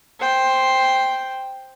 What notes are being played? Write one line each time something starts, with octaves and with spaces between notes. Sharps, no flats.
C5 G5